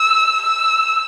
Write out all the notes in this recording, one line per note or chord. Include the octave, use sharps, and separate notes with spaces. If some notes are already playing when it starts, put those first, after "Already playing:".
Already playing: E6
E6